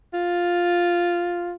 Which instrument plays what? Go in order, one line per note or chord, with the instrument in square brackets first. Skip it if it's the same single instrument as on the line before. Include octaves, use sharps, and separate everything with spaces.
[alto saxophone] F4